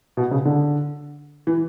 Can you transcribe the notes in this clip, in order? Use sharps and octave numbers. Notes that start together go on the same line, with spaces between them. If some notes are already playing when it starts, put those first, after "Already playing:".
B2
C#3
D3
E3